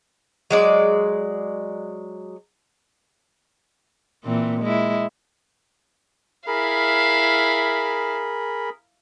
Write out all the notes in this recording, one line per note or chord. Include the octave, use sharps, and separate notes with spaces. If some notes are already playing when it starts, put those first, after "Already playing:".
F#3 G#3 D5
A#2 E3 C4
G#3 E4
E4 G#4 A#4 F5 B5